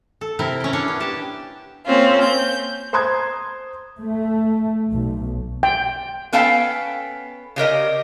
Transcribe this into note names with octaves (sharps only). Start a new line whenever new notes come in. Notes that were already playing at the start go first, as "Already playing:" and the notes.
A4
C3 E4 A#4 G5
C#4 G5
C#4 D4 C#5 D5
B3
G4 A5
A#3 C4 C#4 F4
G6
C5 A#5 C6 D#6 G#6
A3
B1
G5
B3 C#4 A4 F5 G5 A5
C#3 G4 A#4 D#5